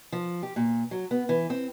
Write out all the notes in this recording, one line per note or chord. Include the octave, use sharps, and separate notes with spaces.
F3
G4
A#2
F#3
B3
E3
C4